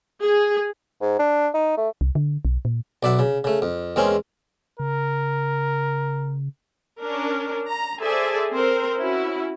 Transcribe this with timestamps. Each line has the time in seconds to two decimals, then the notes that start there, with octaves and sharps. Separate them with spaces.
0.23 G#4
1.02 G#2
1.19 D4
1.54 D#4
1.77 A3
2.01 C2
2.15 D3
2.45 B1
2.65 A#2
3.03 B1 D5 E5 F#5
3.19 C#3
3.44 C#3 A3
3.62 F2
3.96 E2 G#3 C4 C#4 A#4
4.80 C#3 A#4
6.99 C#4 D4 A#4
7.67 A#5
8.01 G#4 A4 C5 D5 E5 G#5
8.50 C4 A#4 C5
8.97 C#4 E4 F#4